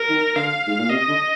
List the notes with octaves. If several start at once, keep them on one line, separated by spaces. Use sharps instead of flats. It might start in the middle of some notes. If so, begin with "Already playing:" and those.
Already playing: A#4
D#3
D3 F5
G#2
A#2
C3 D#5
D3